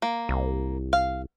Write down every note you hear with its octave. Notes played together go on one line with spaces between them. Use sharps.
A#3
C2
F5